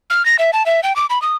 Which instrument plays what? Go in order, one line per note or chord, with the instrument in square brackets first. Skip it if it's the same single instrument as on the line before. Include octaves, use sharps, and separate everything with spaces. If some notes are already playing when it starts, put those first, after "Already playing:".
[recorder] F6
A#6
E5
A5
E5
G5
D6
B5
D#6